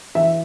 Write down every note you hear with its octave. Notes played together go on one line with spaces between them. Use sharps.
E3 E5